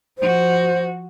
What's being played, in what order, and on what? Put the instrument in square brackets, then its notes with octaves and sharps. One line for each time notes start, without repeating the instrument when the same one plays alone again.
[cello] F3 F#4 [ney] C5